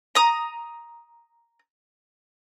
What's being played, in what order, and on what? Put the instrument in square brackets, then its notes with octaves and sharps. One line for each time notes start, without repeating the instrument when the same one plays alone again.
[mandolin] A#5 D#6